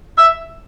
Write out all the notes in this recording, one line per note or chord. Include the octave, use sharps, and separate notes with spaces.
E5